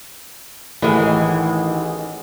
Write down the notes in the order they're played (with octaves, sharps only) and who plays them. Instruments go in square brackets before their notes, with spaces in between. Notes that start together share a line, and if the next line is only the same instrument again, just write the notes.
[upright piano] A1 [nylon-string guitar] D#3 A3 [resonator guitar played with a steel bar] E3 G#3 [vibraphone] D#5 F#5 G#5